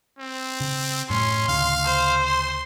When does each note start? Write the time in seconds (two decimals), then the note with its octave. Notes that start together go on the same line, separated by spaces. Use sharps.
0.19 C4
0.60 C#3
1.10 F#2 A2 C#4 C6
1.48 D2 C#3 F5
1.86 C5
2.25 C6